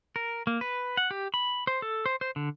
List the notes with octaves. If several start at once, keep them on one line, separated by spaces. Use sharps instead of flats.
A#4
A#3
B4
F#5
G4
B5
C5
A4
C5
C5
D3